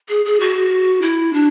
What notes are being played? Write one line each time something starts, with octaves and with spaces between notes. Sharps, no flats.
G#4
G#4
F#4
E4
D4